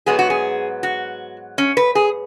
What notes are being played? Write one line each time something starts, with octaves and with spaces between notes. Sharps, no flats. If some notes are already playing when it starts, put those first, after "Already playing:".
G#2 F#3 B3 G#4
F#4
G#4
F#4
C#4
B4
G#4